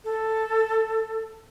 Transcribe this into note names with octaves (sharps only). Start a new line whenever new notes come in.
A4